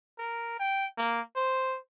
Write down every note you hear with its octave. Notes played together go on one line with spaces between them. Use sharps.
A#4
G5
A#3
C5